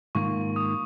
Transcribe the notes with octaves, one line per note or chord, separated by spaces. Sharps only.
G#2 D#3 A#3 F4 C#6
D#6